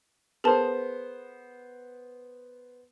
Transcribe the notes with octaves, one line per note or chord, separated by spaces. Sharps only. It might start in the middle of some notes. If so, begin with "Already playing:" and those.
B3 G#4 A#4 C5 A5